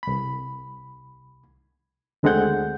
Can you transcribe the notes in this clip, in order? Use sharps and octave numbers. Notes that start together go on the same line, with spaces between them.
C2 B5
D2 D3 G#3 C4 F#5 G6